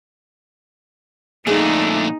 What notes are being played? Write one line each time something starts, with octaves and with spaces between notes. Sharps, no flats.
F2 A#2 A3 D4 D#4 G#4